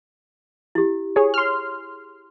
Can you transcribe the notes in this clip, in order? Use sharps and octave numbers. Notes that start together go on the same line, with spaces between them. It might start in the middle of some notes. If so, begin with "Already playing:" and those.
E4 G4
G#4 C#5
C6 F6